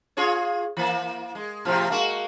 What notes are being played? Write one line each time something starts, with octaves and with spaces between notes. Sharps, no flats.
F4 G#4 C#5
E3 A#3
G#3
A2 C3 F3
G#3 A#3 F#4